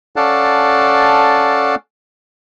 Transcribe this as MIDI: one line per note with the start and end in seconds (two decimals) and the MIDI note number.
0.16 1.75 61
0.16 1.75 69
0.16 1.75 74
0.16 1.75 77
0.16 1.75 78
0.16 1.75 81